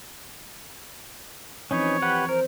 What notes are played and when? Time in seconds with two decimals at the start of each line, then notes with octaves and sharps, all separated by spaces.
1.71 E3 F3 C4 C#4 D#4 B4 C#5
2.02 G4 B4 F#5
2.29 A#4 C5